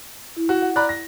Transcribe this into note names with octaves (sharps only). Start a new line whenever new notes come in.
E4
F#4
F#5
D5 A#5 B5 F#6
A#6